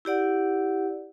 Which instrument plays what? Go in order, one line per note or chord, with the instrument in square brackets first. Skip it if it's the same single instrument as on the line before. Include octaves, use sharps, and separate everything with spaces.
[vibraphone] E4 G4 D5 F#5